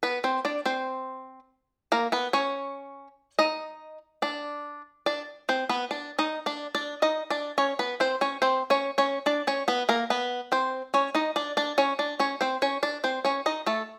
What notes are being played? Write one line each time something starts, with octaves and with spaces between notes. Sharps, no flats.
B3 B4
C4 C5
D4 D5
C4 C5
A#3 A#4
B3 B4
C#4 C#5
D#4 D#5
D4 D5
D4 D5
C4 C5
B3 B4
D4 D5
D#4 D#5
D4 D5
D4 D5
D#4 D#5
D4 D5
C#4 C#5
B3 B4
C4 C5
C#4 C#5
C4 C5
C#4 C#5
C#4 C#5
D4 D5
C#4 C#5
B3 B4
A#3 A#4
B3 B4
C4 C5
C#4 C#5
D#4 D#5
D4 D5
D4 D5
C#4 C#5
D4 D5
C#4 C#5
C4 C5
C#4 C#5
D4 D5
C4 C5
C#4 C#5
D#4 D#5
A3 A4